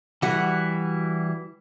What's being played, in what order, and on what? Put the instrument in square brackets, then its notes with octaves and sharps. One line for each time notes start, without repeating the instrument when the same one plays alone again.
[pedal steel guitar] E3 G3 E4 [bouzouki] F#4 F#5